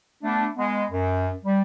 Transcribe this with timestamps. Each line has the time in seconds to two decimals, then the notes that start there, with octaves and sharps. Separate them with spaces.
0.23 A3 B3 D4
0.56 G#3 B3
0.90 F#2
1.44 G3